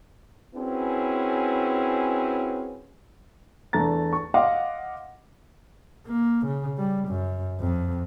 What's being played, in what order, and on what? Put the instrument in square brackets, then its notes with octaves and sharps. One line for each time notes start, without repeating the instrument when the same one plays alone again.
[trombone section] C4 C#4 E4 F#4 G#4 B4
[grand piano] E2 A3 D4 A#5 A6
C#6
D#5 F5 F#5 C6 D6
[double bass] A#3
C#3
G3
F#2
F2